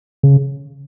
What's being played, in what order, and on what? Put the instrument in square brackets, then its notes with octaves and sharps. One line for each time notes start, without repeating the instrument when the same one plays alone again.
[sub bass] C#3